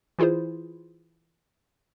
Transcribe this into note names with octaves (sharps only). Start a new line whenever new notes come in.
E3 E4 F4 G#4 C5